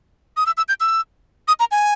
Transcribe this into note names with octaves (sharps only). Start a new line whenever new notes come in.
D#6
E6
E6
G6
E6
D#6
A#5
G#5